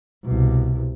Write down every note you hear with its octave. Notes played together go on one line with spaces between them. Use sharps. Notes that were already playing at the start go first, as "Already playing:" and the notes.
C2 B2